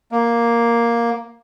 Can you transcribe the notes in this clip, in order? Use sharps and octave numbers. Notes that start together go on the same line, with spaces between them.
A#3